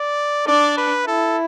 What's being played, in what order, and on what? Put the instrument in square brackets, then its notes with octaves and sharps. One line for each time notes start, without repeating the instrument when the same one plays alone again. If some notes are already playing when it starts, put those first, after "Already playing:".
Already playing: [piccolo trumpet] D5
[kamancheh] D4 [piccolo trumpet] D5
[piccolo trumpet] B4
[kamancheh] E4 [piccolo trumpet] A4